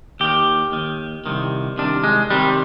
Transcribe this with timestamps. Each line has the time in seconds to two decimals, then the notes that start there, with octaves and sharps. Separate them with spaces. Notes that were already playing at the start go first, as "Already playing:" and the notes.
0.20 D#2 D#3 G4
0.72 D#2 D#3
1.26 C2 C3 D#3
1.78 C2 C3 D#3 D4
2.04 G#3
2.30 C2 C3 D#3 G3